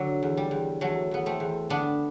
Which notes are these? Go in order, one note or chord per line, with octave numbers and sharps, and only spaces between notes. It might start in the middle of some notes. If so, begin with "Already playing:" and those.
Already playing: D3 F#3
E2
G3
E2
E2 F#3 A3
E2 B3
A3 C4
E2
D3 B3 D4